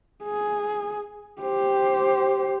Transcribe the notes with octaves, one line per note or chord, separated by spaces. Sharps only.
G#4
G4 C5